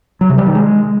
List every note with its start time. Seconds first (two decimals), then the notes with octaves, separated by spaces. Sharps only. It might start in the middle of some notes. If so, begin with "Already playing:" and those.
0.21 F#3
0.29 C3
0.38 G3
0.46 D#3
0.55 G#3